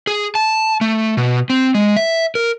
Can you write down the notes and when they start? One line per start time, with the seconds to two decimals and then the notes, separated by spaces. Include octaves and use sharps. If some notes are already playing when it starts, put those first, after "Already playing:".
0.07 G#4
0.35 A5
0.81 A3
1.17 B2
1.50 C4
1.75 G#3
1.96 E5
2.35 A#4